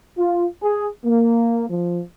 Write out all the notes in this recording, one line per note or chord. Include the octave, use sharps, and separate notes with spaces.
F4
G#4
A#3
F3